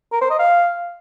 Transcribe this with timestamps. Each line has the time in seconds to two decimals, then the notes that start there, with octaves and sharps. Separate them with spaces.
0.12 A#4
0.21 C5
0.30 D#5
0.39 F5